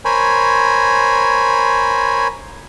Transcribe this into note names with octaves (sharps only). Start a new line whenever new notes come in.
A#4 C5 C#5 G#5 B5